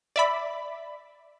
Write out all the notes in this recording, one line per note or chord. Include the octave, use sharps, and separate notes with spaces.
D5 E5 B5